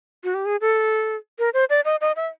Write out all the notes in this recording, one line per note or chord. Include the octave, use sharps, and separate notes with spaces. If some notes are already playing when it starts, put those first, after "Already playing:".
F#4
G4
G#4
A4
A#4
C5
D5
D#5
D#5
E5